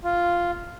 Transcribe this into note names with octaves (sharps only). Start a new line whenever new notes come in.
F4